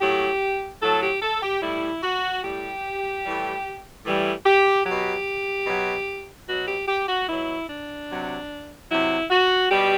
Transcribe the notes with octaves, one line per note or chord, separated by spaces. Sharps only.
A2 F#3 G4
A2 F#3 A4
G4
A4
G4
A2 G3 E4
F#4
A2 G3 G4
A2 E3 G3
A2 E3 G3
G4
B2 F#3 G4
B2 F#3
B2 F#3 F#4
G4
G4
F#4
B2 F#3 E4
D4
C3 F#3
C3 F#3 E4
F#4
B2 G3 G4